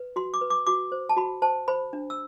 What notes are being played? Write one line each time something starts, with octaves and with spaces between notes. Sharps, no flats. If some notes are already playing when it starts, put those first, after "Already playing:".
Already playing: B4
F#4 C6
D6
B4
D6
F#4 D6
C5
A5
F#4 B5
C5 A5
C5 B5
D4
E6